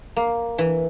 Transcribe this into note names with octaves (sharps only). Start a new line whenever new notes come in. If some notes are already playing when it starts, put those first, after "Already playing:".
A#3
E3